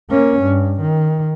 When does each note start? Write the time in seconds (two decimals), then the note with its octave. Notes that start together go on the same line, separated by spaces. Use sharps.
0.10 A#3 C#4
0.41 G2
0.81 D#3